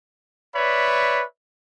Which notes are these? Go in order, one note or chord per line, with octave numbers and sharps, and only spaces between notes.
B4 C#5 D5 E5 B5